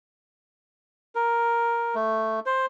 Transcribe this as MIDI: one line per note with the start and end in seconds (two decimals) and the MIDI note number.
1.15 1.95 70
1.95 2.40 57
2.46 2.66 72